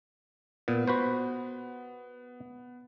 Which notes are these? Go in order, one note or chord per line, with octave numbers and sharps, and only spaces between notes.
A#2 B3
F#4 B4 C5